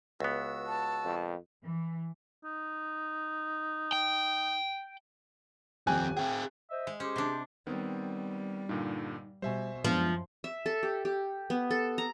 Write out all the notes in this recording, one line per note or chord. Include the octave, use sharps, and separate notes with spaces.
C#2 B3 F#4 E6
A5
F2
E3
D#4
G5
D#1 F2 C4 G4 G#5 F#6
C4 G#4 G5
C5 D#5 E5
G#3
C#4 G4 G#4 C5
C3 D4
D#3 G3 B3 C4
G2 A#2 D3 D#4
B2 G3 C5 E5 G#5
F#2 F3 G#3 B3 D4
E5
A4
G4
G4
B3
A4
A#5